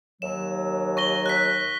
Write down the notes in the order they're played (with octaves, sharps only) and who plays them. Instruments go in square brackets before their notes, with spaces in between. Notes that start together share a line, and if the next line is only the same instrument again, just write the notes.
[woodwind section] D#2 F#3 [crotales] E7
[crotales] C#6 A#6 G7
F#6 B6